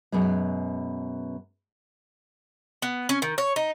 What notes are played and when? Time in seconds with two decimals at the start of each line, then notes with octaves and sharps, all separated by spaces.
0.12 F#2 B2 G#3
2.82 B3
3.09 C#4
3.22 D#3
3.38 C#5
3.56 D#4